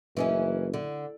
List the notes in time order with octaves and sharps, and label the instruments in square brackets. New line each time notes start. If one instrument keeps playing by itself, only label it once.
[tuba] F#1 [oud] E3 C#4 D#4
[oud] D3